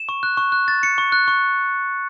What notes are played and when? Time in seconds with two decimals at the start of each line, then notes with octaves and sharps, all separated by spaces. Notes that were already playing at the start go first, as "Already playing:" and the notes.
Already playing: E7
0.09 C#6
0.23 F#6
0.37 C#6
0.52 F#6
0.68 A6
0.83 C#7
0.98 C#6
1.12 F#6
1.28 C#6